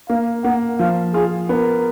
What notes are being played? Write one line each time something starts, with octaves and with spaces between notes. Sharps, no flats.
A#3 F5
A#3 F#5
F3 F5
F4 G#4
B3 A#4